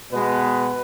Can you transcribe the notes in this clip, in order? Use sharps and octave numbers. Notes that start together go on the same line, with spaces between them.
B2 G#3 B3 B4